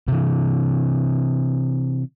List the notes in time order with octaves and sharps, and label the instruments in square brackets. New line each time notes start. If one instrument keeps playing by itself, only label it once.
[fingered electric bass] C3 E3